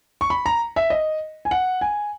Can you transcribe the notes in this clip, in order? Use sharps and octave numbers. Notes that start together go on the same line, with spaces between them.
C#6
B5
A#5
E5
D#5
G#5
F#5
G#5